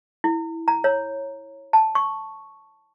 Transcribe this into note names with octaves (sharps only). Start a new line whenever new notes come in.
E4
A#5
C#5
A5
C#6